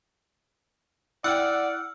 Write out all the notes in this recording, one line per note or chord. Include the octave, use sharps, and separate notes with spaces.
E4 D5 F#5 G5 E6 F6